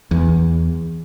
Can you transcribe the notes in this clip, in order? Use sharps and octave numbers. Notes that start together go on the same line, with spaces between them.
E2